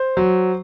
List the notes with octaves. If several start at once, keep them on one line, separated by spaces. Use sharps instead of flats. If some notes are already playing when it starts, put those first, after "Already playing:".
Already playing: C5
F#3